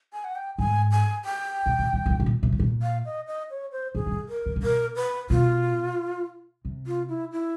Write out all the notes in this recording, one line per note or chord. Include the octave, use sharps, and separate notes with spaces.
G#5
F#5
G5
G#2 G#5
G#5
G5
B2
A#2
A2
B2
A#2
B2
A#2
B2
A2
A#2
F5
D#5
D#5
C#5
C5
A2 G#4
A#2
A2
A#4
C3
A#2
B2 A#4
B4
B2 F4
C3
F4
E4
E4